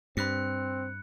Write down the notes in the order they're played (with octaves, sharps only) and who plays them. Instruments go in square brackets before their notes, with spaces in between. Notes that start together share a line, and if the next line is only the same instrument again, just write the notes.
[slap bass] G2 [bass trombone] C4 [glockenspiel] B5 F#6 C#7